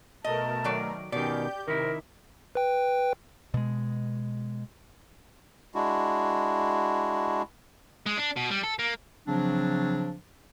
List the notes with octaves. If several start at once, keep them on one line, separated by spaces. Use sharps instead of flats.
B2 A3 A#4 D#5 A5
D#3 F#3 D5
B2 D#3 C#4 G4 D5 G6
C3 D#3 E4 A#4
B4 G5
B2 G#3
G#3 D4 E4 F#4
G#3
D4
B2
G3
A4
A#3
C#3 F3 F#3 C4 D4